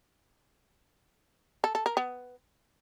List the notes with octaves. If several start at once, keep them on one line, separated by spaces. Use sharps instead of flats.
A4
A4
A#4
B3